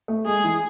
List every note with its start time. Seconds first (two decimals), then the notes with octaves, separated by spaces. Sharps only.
0.08 A3
0.26 G#3 G#4
0.44 E3